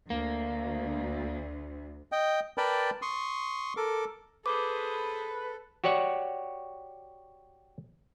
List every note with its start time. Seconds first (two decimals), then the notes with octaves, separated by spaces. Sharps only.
0.10 D2 A#3
2.12 D#5 G5
2.58 A#4 B4 D5 G5 A5 B5
3.02 C6 C#6 D#6
3.77 A4 A#4 D6
4.46 G#4 A4 B4 C5 D6
5.84 F#4 G4 C#5 D5 F#5